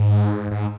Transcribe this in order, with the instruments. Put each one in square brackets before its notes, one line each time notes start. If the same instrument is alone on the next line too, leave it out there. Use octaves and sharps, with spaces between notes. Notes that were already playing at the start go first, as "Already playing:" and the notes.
Already playing: [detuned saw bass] G#2
G#2